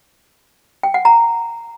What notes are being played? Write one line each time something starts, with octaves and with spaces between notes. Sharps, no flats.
G5
F#5
A#5